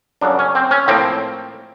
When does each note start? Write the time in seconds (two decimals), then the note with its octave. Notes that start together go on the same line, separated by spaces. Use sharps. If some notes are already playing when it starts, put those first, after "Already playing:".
0.21 F#2 C#3 F#3 D4
0.39 C#4
0.55 C4
0.71 C#4
0.88 A2 F3 A#3 C4